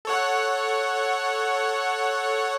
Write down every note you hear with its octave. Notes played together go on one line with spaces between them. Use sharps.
A4 C#5 F#5